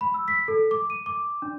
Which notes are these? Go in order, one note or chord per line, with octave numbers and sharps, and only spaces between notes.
B5
E6
B6
A4
D6
D#7
D6
D4